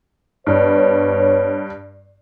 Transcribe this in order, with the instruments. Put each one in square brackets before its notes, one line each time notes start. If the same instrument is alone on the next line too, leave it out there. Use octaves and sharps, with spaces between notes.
[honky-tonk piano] G2 [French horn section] B3 C5 C#5